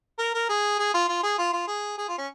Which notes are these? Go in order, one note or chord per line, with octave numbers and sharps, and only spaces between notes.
A#4
A#4
G#4
G#4
F4
F4
G#4
F4
F4
G#4
G#4
F4
C#4